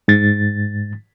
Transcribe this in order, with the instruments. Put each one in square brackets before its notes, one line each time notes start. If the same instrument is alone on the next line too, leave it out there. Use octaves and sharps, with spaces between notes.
[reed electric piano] G#2 A6